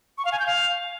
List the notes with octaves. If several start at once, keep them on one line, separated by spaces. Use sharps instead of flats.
C#6
F5
G#5
G6
F5